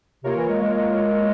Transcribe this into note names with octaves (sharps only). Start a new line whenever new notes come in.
C3 A#3 F4 A#4 C#5
E3
G#3
G#3
G#3